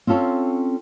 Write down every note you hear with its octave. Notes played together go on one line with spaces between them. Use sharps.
C4 C#4 F4 A4 C#5